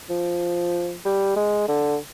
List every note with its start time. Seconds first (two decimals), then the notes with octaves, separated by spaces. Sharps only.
0.10 F3
1.05 G3
1.36 G#3
1.68 D3